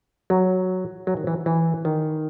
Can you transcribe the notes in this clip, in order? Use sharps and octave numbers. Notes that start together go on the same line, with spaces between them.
F#3
F#3
D#3
E3
E3
D#3